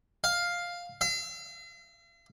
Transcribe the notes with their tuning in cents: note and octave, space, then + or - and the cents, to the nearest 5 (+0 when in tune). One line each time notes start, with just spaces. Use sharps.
F5 +5
F5 -45